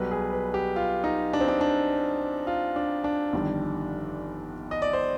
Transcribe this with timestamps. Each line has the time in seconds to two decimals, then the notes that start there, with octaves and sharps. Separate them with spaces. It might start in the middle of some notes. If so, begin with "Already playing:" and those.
Already playing: B1 B2 G3 B4
0.11 G#4
0.33 B4
0.54 G4
0.76 F4
1.04 D#4
1.33 D4
1.41 C4
1.48 D4
1.61 D4
2.47 F4
2.76 D4
3.04 D4
3.33 G1 F2 D#3 G3
4.71 D#5
4.82 D5
4.93 C5